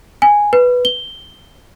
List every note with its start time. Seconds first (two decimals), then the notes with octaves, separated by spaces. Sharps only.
0.22 G#5
0.53 B4
0.85 G7